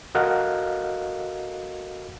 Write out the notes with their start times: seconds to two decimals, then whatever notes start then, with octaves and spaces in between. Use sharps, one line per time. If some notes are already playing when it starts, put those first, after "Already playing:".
0.15 F#4 A4 A#4 D#5 F5 F#5